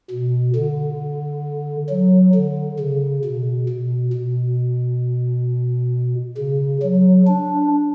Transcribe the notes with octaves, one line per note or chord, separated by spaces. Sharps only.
B2
D3
F#3
D3
C#3
B2
B2
B2
C#3
F#3
D4